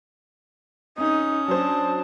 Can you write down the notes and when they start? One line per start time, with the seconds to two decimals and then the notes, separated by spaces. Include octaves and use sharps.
0.98 C2 C#4 D#4 D#6
1.48 F#3 D4 C5 A5